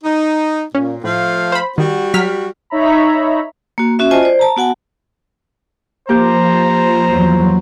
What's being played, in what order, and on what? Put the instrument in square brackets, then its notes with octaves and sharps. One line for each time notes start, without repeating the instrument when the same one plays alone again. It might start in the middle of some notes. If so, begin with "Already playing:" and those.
[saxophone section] D#4
[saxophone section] A#2 [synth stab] C#4
[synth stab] A2 [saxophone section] F3 A3 F5
[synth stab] C5 B5
[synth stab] D#3 [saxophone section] G3 F#4
[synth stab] F#3 F6 B6
[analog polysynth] D#4 C#5 E5 A#5 B5
[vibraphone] A#3 F#4
C#4 F#4 E5
F4 C5 D#5 G#5 A5
C5 D5
A5 A#5
B3 F#4 F#5 G#5 A5
[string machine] F3 [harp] A#3 G4 G6 [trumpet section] C5 A#5
[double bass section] E2 F#3